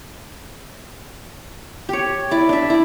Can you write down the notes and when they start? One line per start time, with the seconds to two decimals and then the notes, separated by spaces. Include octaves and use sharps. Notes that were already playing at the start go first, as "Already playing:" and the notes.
1.89 G4 C#5
2.31 E4 D5
2.49 D4 E5
2.70 E4 D5